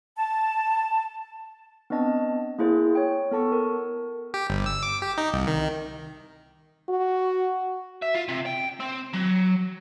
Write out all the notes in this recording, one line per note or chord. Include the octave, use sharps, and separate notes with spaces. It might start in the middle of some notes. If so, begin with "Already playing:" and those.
A5
B3 C4 D4 D#5 A5
A#3 E4 G#4 C5
C#5 G5
B3 A4 A5 C#6
A#4
G4
G1
E6
D6
G4
D#4
C2
D#3
F#4
E5
F4
C3
G5
C4
F#3